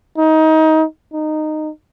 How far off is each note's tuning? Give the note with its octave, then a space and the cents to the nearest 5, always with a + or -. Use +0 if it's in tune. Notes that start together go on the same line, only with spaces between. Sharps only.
D#4 +25
D#4 -15